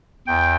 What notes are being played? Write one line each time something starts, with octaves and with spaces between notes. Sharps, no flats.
E2 G5